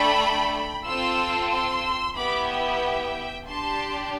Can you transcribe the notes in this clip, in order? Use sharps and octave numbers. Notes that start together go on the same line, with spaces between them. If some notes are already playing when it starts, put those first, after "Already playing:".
Already playing: A3 D4 A4 G5 B5
C4 F4 A4 C6 E6
C6 E6
B3 E4 G4 B5 D6
E5 G5
D4 G4 A5 C6